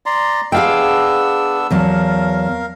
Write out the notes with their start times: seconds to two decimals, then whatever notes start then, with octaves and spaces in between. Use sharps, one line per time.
0.06 D5 A#5 C6
0.52 B3 D4 G#4 F5 G5 E6
1.71 E2 F#3 A#4 F5 A5